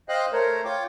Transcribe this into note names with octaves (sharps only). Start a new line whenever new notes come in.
C5 D#5 F5 G5 F#6
A3 A#4 C5 C#5
F4 C#5 G5 D6